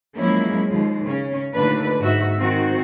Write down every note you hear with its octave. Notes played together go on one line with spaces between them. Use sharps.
F3 F#3 G#3 A#3 C#4 E4
D#2 F3 G#3
C#3 C#4
D#2 A#2 D3 A3 D4 B4
G#2 F#4 E5
D#3 C4 F#4